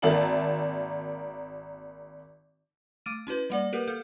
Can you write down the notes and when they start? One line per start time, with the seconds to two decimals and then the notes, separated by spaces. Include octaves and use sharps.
0.02 G#1 A#3 E5 A5 F#7
3.06 A3 D6 F6 A6 D7 D#7
3.27 C#4 E4 F#4 B4
3.50 G3 A#3 D5
3.73 A#3 G4 A#4 B4
3.87 A#3 A4 F5 G6